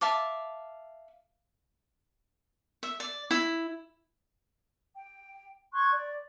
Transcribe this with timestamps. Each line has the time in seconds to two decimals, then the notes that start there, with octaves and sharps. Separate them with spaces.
0.01 E5 F5 A5 D6
2.83 E5
3.00 D5
3.31 E4
4.95 G5
5.72 C6 C#6 F#6 G#6
5.90 D5